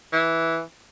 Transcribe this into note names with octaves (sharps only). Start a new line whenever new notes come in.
E3